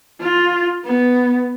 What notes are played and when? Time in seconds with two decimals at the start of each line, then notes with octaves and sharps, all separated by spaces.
0.21 F4
0.85 B3